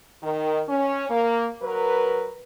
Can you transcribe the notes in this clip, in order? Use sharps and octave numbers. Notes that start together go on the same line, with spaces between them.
D#3
C#4
A#3
F#3 A#4 B4